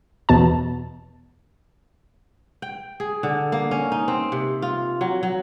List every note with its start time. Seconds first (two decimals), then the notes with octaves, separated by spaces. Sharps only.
0.29 E2 B2 A5
2.62 G5
3.00 G#4
3.23 D3
3.52 A#3
3.71 C#4
3.92 D#4
4.08 C4
4.32 C3
4.62 F4
5.01 F#3
5.23 F#3